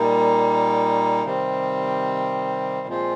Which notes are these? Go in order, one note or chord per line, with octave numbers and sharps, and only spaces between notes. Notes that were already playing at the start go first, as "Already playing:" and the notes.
Already playing: A#2 G3 A#3 D#4
C3 D#3 G3 C4
A#2 F3 G#3 C4 F4